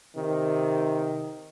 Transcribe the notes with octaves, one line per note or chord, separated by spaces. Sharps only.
C3 D#3